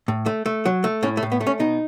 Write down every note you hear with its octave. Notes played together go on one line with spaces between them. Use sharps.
A2
A3
A3
F#3
A3
A2 C#4
A3
A2
B3
A3
C#4
B2 D#4